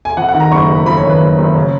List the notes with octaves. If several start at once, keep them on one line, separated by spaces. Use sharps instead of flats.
G#5
F2 F#5
F#5
D#3
A#5
F#1 C#6
F#1
B5
F2 B5
C#5
D#3
B4
F#1
F#1
C#3